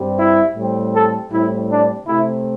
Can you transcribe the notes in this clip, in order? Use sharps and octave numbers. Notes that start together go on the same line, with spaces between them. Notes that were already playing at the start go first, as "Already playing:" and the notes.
Already playing: G2 G3 C4
E4
A2 G3 C4
A4
A2 G3 C4 E4
D4
C3 A3 C4 E4